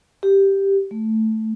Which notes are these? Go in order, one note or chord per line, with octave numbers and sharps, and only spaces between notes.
G4
A3